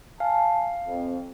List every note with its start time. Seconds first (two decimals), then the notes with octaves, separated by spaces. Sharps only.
0.20 F5 G#5 A5
0.87 F2